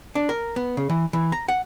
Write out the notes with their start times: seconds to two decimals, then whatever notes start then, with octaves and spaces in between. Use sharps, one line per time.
0.15 D4
0.29 A#4
0.56 B3
0.77 C#3
0.90 E3
1.13 E3
1.32 A#5
1.48 F#5